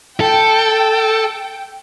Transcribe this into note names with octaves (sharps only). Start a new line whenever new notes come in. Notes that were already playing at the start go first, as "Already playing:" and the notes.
A4 G5